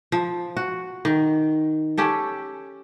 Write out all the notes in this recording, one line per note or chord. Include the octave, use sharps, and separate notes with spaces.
F3
F#4
D#3
C#4 G4 A4